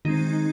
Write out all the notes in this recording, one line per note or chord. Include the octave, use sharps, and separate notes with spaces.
D#3 G#3 C4 D#4